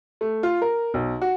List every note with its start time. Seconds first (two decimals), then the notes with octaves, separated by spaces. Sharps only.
0.21 A3
0.43 F4
0.62 A#4
0.94 B1
1.22 F#4